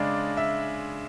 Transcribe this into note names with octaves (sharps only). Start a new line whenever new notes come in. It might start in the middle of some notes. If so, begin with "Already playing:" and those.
Already playing: C#3 G#3 D4 G#4 D5
E5